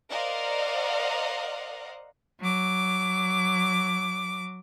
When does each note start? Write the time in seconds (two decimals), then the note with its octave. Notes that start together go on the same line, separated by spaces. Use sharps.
0.11 A#4 C5 D5 D#5 F5 F#5
2.41 F#3 D6